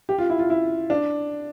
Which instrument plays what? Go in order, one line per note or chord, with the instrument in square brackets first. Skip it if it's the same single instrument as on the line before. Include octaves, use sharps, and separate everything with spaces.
[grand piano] G4
F4
E4
F4
E4
D4